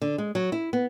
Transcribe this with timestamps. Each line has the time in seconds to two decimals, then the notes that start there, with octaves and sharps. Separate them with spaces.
0.01 D3
0.18 G#3
0.35 F#3
0.52 E4
0.73 B3